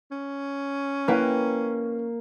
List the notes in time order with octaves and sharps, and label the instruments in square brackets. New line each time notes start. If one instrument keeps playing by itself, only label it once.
[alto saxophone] C#4
[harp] A#3 [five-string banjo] E4 B4 G5